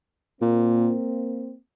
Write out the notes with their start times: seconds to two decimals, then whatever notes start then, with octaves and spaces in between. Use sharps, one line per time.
0.41 A#2 A#3 C4